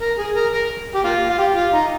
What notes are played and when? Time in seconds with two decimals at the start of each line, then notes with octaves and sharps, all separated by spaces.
0.01 A#4
0.18 G#4
0.35 A#4
0.53 A#4
0.95 G4
1.04 A#3 F4
1.30 F4
1.38 G4
1.56 F4
1.73 D#4